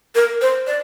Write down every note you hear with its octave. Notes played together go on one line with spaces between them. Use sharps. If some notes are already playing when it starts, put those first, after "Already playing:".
A#4
C5
D5